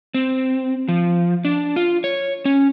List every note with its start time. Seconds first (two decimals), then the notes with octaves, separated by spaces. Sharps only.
0.14 C4
0.88 F3
1.45 D4
1.76 F4
2.04 C#5
2.45 C#4